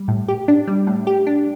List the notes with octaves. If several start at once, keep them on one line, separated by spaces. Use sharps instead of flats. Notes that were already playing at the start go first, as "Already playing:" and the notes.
Already playing: G3
A2
G4
D4
G3
A2
G4
D4